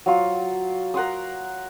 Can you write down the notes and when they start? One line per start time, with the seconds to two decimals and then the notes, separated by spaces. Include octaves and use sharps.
0.06 F#3 F4
0.94 A#4 F#5 C6 D#6